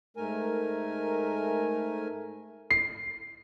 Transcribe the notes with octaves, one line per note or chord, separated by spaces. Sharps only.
G#2 A3 A#4 G#5
C7